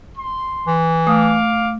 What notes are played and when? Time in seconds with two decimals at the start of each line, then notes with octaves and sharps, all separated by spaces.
0.16 C6
0.67 E3
1.07 A3 F5 D6 D#6